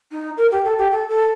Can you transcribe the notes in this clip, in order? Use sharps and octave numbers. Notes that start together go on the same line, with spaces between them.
D#4
A#4
G4
A4
G4
A4
A4